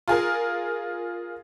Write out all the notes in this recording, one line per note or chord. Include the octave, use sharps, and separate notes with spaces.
F4 G#4 A#4